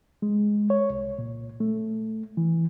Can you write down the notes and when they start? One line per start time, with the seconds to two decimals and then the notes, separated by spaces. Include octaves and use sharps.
0.22 G#3
0.70 C#5
0.90 C2
1.18 A#2
1.60 A3
2.37 E3